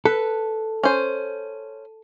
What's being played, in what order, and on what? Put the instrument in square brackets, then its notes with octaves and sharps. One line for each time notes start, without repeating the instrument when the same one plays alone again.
[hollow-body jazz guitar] A4 [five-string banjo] B4
[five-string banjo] C#4 C5